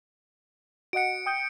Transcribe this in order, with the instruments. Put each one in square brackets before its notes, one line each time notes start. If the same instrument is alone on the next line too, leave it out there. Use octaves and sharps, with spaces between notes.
[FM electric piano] F#4 D#5 F#5 [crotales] C#7 D7
[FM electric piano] G5 D#6 G6